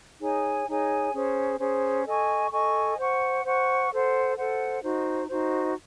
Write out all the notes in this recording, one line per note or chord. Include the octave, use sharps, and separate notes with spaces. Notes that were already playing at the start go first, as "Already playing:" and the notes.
D#4 G#4 C#5 G#5
D#4 G#4 C#5 G#5
C#4 G#4 C5
C#4 G#4 C5
A4 D#5 G#5 C#6
A4 D#5 G#5 C#6
C5 F#5 C#6
C5 F#5 C#6
A4 C5 F#5
A4 C5 F#5
D#4 F#4 C5
D#4 F#4 C5